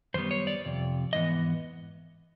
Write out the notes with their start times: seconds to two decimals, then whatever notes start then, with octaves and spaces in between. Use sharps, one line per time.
0.14 F#2 D#3 G3 B3 C5
0.31 C#5
0.47 D5
0.65 F2 C3
1.13 G#2 E3 B3 D#5